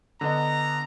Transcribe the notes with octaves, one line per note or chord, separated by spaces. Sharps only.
D3 B3 D#5 A#5